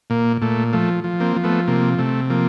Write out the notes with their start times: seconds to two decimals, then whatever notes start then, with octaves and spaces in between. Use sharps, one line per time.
0.10 A#2 A#3
0.42 A#2 A3
0.73 F3 A3
1.04 F3
1.20 A#3 C4
1.36 F3
1.44 A3 B3
1.67 C3 A#3
1.99 C3 A3
2.30 F3 A#3